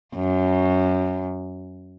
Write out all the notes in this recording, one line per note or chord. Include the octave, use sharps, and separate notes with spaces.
F#2